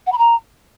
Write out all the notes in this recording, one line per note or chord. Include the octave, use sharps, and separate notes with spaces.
F#5
B5
A#5